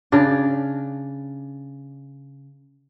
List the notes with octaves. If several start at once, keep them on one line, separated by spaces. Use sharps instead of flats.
C#3 D4